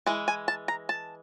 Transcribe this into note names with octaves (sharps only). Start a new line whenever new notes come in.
E3 G#3
G#5
A5
A#5
A5